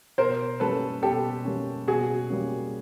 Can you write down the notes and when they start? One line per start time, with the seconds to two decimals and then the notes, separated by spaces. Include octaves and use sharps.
0.18 B2 A#4 C5
0.60 G3 A#3 C#4 A4 B4
1.03 B2 G4 A4
1.45 G3 A#3 C#4
1.88 B2 F#4 G#4
2.30 G3 A#3 C#4